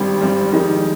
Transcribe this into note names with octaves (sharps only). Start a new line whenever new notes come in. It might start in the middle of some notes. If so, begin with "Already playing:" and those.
Already playing: G#1 G2 G3 C4
G#1 G2 G3 C4
F2 D#3 G#3 D#4 G4